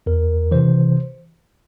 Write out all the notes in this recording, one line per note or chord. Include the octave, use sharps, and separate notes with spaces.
E2 A#4
C3 E3 C5